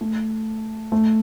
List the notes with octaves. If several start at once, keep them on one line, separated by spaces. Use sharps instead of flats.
A3
A3